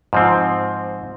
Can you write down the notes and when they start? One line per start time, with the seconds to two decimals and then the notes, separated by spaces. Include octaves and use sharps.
0.13 G#2 F3 C4